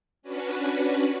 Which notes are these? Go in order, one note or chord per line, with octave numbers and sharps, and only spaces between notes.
C#4 D4 F#4 B4